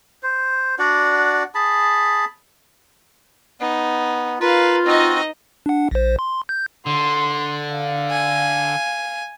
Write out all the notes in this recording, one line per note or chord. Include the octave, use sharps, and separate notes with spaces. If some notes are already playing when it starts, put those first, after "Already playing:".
C5
D4 F#4 D5 F#5
G#4 A5 B5
B3 D#4
F4 A#4 B4 F5
C4 D#4 F#4 D#5
D4 F#5
A#1 C5
C6
G6
D3 C6
F5
G#5